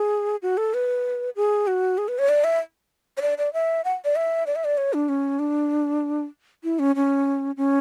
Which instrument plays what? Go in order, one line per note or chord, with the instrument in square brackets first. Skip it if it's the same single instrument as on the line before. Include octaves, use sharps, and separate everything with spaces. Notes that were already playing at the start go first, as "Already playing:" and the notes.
Already playing: [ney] G#4
F#4
A4
B4
G#4
F#4
G#4
B4
C#5
D5
E5
C#5
D5
D5
E5
F#5
D5
E5
D5
E5
D5
C#5
D4
C#4
D4
E4
C#4
C#4
C#4